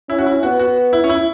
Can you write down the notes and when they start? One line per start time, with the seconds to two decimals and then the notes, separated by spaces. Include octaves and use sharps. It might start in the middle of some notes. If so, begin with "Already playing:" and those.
0.09 C#4 E4
0.19 F#4
0.26 E4
0.43 B3 F#4
0.60 F#4
0.93 E4
1.04 C#4
1.09 E4